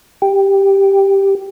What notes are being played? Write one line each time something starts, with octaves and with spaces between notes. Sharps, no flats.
G4